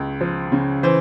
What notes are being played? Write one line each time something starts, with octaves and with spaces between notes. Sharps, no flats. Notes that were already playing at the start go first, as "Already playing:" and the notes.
Already playing: C#2 C#3 G#3
F3
C#3
E3 C5